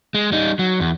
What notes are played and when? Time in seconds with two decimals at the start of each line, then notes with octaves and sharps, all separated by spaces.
0.14 G#3
0.32 G3 D#4
0.59 F#3
0.80 E2